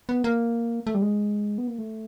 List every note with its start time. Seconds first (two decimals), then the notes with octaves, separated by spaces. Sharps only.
0.09 B3
0.24 A#3
0.87 A3
0.95 G3
1.02 G#3
1.58 B3
1.68 A#3
1.79 A3